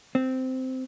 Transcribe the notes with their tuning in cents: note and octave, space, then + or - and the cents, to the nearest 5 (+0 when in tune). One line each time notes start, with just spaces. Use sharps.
C4 -10